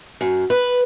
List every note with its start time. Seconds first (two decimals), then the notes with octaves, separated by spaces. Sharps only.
0.21 F#2
0.50 B4